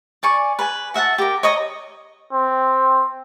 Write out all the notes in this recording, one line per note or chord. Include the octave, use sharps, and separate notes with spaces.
D5 G#5 C#6
B4 G#5
F#4 E5 F#5 A5
G4 A#4
C#5 D#5 A#5 D#6
C4